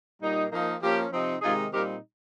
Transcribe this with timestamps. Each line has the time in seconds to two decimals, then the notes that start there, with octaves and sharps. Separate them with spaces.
0.21 A#2 G3 A#3 D#4
0.52 F3 A#3 D#4
0.82 F3 A#3 C#4 G4
1.12 C3 F3 C4 D#4
1.42 C3 D#3 G#3 D#4 F4 G#4
1.73 A#2 G3 C4 D#4 G4 A#4